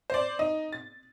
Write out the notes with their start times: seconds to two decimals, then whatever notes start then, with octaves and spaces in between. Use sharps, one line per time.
0.10 C5 D5
0.39 D#4
0.72 A6